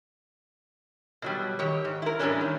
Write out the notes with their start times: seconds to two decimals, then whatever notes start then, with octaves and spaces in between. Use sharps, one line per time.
1.22 B2 F#3 G3
1.59 D#3 G4 C#5
1.85 G#2
2.02 E4 A#4
2.19 A2 E3 F3 G3 C#4 D4
2.41 D#3